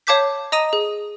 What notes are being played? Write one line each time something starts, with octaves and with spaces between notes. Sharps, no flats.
C#5 F5 A5 D6 G6 B6
D#5 A#5 D#6 D#7
G#4